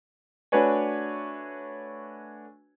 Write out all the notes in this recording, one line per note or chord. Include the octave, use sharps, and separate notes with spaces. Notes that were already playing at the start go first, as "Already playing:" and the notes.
A3 D4 F#4 B4 C#5 G#5